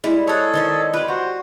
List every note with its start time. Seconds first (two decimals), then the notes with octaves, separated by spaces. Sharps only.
0.04 G3 G#3 E4
0.27 G#4 A4 C#5 F#5
0.54 D#3 C#4 C5 D5
0.94 F4 G4 B4 D5
1.08 F#4 C5 A#5